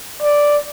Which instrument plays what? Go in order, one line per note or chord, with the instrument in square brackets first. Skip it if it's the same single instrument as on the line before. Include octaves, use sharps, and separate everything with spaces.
[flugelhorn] D5